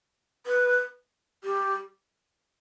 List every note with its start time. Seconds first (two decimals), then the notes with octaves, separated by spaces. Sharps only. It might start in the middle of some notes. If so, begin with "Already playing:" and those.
0.47 B4
1.44 G4